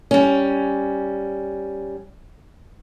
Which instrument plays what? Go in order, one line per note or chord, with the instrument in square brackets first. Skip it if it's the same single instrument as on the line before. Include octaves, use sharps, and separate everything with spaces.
[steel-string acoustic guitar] G3 C#4